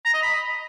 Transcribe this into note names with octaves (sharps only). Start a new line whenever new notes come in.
A#5
D#5
B5